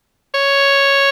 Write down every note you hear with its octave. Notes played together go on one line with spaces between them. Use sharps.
C#5